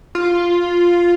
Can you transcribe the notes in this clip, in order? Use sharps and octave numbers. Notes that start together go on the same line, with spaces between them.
F4